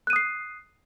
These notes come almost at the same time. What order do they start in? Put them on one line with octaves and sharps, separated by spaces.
F#6 D#7 D#6 C7